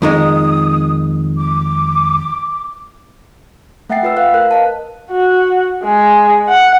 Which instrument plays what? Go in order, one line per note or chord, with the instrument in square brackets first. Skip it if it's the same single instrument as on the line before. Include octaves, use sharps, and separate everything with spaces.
[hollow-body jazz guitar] F2 D#3 G#3 [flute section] D#6
[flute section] D6
[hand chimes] A3 E5 F#5 G5 A6 C7
F4 B4 E6
B4 F5 F#6
A#4 F#6
D#5 F5 A5
[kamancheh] F#4
G#3
F#5